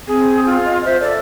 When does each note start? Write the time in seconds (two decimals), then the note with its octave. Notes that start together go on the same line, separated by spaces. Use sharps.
0.08 C4 G#4
0.46 F4
0.65 D#5
0.85 C5 E5
1.00 A4 D5